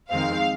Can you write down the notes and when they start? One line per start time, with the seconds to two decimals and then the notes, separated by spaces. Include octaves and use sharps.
0.10 F2 D#3 G#3 C4 F5